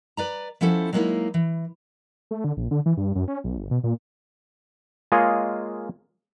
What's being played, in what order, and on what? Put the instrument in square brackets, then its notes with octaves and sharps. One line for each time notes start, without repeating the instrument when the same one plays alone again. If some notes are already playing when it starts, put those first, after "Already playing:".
[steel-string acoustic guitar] B4 D5 A#5
F3 B3 C#4 E4 A4 C5
F#3 G#3 A#3 D#4 E4 F5
E3
[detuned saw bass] A3
D3
A#1
D3
E3
G2
F#2
C#4
B1
G1
B2
A#2
[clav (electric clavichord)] G#3 A#3 F4 G#4 C#5 D#5